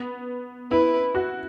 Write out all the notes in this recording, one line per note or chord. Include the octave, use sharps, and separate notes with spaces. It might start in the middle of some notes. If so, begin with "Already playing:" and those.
Already playing: B3
E4 B4
F#4